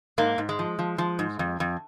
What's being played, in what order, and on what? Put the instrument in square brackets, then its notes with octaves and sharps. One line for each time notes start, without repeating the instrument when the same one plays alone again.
[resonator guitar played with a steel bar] G#2 A#3
G#2
G#3
F3
F3
F3
G#2
F2
F2